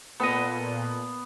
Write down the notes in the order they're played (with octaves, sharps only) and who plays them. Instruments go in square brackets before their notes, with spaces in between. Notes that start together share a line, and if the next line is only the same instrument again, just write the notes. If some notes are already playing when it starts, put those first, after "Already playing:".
[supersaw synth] A#2 [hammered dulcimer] B3 [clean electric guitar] A4 B4 D#5